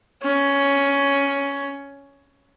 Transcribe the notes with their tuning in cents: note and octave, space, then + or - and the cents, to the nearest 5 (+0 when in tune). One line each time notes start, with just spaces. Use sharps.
C#4 +10